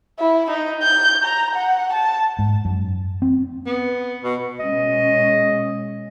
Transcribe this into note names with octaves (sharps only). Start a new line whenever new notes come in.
E4
D#4
G6
A#5
F#5
A5
G#2
F#2
C4
B3
B2
B2 G#3 C#4 D#5